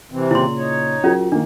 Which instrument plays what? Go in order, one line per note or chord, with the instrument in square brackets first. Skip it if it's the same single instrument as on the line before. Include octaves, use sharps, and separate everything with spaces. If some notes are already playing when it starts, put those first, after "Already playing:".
[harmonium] C3 E3 C4
[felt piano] A#2 C#3 [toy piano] E4 C6
[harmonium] D#4 C#5
[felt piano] F#3 G#4 A#4 [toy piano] C#4 F4
[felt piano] D#3 A#3 [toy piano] D4